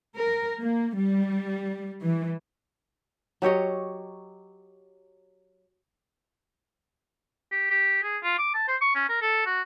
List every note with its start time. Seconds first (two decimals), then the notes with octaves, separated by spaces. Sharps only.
0.16 A#4
0.60 A#3
0.96 G3
2.02 E3
3.42 F#3 G4 C#5 D#5
7.52 G4
7.71 G4
8.03 G#4
8.23 F4
8.38 D6
8.54 A5
8.68 C5
8.81 C#6
8.95 C#4
9.09 A#4
9.22 A4
9.46 F#4